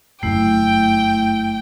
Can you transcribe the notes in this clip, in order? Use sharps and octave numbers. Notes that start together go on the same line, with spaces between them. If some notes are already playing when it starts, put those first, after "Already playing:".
G1 F#2 A3 E4 G5